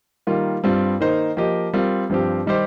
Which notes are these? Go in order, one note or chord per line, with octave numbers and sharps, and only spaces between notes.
D#3 G3 A#3 F4
G2 G3 C4 F4
D#3 A#3 D#4 C5
F3 A#3 G4 D#5
G3 C4 F4 A#4
G2 F3 C4 G4
D#3 G3 D#4 G4 C5